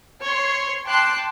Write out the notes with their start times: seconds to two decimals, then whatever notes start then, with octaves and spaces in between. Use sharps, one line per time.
0.22 C#5 C6
0.86 G5 A5 C6 D6 F#6